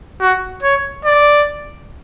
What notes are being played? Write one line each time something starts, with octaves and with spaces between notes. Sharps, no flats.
F#4
C#5
D5